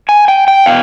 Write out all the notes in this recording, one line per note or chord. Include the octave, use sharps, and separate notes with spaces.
G#5
G5
G5
B2 F5